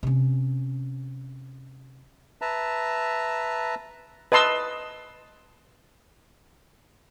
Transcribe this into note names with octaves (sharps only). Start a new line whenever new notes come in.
C3 C#4
B4 E5 A5 A#5
B4 D#5 A5 C6 E6